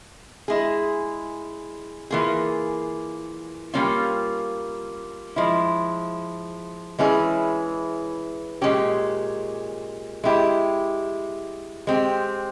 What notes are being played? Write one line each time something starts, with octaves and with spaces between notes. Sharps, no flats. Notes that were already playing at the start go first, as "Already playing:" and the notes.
G#3 E4 G#4
E3 A#3 F4 G#4
G3 A#3 C#4 F4
F3 G#3 E4
E3 G#3 C#4 E4 G#4
A#2 G#3 C#4 G4
G#3 E4 G4
G#3 C4 G4